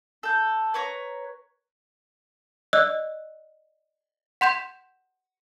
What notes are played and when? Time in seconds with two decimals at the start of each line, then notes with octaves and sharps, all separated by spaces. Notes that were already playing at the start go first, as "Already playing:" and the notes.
0.23 A4 G6
0.74 B4 C#5 A#5
2.73 D5 D#5 E6 F#6
4.41 F#5 C6 G6 E7